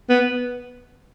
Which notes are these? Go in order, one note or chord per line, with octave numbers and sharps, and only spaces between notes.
B3